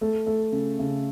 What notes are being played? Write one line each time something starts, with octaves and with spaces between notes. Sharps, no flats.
A3
A3
C#3
C#3